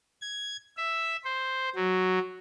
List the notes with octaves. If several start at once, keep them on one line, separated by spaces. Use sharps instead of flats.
G#6
E5
C5
F#3